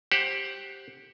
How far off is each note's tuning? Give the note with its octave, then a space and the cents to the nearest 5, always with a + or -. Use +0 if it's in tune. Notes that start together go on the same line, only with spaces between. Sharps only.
G4 +0 C5 +20 F#5 +0